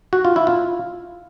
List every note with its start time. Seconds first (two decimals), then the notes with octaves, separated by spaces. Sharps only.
0.13 F#4
0.25 F4
0.36 E4
0.47 F4